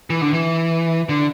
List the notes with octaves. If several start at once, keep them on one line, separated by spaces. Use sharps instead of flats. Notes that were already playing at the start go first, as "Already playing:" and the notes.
E3
D3
E3
D3